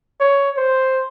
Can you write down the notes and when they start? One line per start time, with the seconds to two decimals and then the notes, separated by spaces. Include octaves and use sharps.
0.20 C#5
0.57 C5